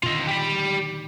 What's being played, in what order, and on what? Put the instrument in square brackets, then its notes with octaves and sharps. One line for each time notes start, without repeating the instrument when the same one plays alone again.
[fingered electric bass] A#2 D3 D#3 [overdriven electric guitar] F4 D#5
[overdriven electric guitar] G4 B5